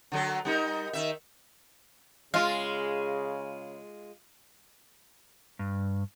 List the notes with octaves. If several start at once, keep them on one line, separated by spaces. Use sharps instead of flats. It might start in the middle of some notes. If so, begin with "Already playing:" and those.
D3 F#3 A4
G3 D#4 A#4
D#3 E5
C#3 G#3 F4 F5
G2